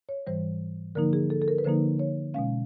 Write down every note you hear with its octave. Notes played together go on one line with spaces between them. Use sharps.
C#5
G#2 E3 G3 C5
D3 F3 A#3 D#4 A#4
G#4
A4
A4
A#4
B4
D3 F3 A#3 D#4 C5
C#5
B2 G#3 C#4 F5